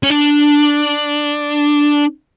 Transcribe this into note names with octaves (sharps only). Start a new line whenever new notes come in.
C#4
D4